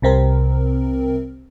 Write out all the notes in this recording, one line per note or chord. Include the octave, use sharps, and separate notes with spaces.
C2 C3 C4 A#4